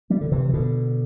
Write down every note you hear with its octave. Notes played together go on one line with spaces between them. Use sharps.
E3 G3
D3
C3 E3
E3
B2 D3